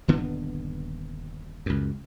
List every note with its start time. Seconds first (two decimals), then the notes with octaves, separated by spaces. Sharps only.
0.08 D#1 G2 D3 B3
1.66 C#2 F#2